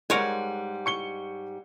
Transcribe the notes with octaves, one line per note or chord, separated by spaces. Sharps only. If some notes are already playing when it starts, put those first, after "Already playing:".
G#2 G3 G#3 A#4 C#5 G#5
C#6 C#7 G7